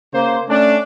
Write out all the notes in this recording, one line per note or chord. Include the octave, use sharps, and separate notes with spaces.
C#3 A#3 C5
A3 C#4 D4